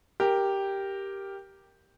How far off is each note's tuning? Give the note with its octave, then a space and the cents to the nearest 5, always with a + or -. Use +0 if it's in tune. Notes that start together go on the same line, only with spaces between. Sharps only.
G4 +0 A#4 +0